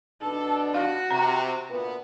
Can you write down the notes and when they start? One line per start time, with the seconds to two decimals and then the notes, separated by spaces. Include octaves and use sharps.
0.22 B2 B3 D4 A4
0.74 F#4 F5
1.11 C3 A#5
1.68 D2 A#2 B3